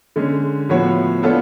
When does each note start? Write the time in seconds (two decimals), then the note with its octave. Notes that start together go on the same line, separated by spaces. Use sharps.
0.16 D3 G#3 C#4
0.69 A2 F3 B3 F#4 C#5
1.23 B3 D4 F4 A4 C#5